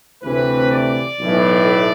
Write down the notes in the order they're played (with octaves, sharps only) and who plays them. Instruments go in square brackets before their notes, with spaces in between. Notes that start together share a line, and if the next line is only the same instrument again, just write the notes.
[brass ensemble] D2 C3 E3 A3 C4 B4
D5
B1 A2 E3